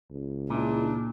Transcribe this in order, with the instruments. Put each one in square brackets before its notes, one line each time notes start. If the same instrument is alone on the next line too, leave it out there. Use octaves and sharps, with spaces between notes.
[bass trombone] C#2
[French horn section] G2 G#3 E4 [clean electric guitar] A#2 [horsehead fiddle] D4